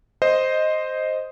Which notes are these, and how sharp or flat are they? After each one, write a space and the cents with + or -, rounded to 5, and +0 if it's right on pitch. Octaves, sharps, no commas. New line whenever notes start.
C5 +0 D#5 +0